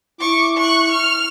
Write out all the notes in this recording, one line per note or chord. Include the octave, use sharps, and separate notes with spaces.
E4 C#6 D6
C#6 F#6
F6